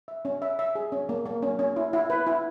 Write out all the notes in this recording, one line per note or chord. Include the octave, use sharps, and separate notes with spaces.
E5
C#4
E5
E5
G#4
C#4
A#3
A#3
C#4
C#4
E4
E4
B4
E4